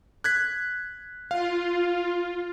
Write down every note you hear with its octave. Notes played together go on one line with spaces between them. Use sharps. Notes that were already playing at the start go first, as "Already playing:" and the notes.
F#6 G#6 B6
F4 F5